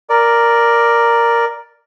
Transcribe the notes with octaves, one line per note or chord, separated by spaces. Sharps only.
A#4 D5